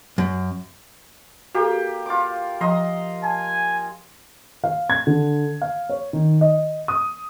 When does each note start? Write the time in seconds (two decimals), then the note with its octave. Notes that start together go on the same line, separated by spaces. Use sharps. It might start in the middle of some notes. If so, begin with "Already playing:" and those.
0.18 F#2
1.55 A#3 F#4 G4 A4
2.06 F4 D6
2.61 F3 D#5 A#5 C6
3.24 G#5 A5
4.64 F5
4.90 G#6
5.07 D3
5.62 F5
5.89 C#5
6.13 D#3
6.41 D#5
6.88 D#6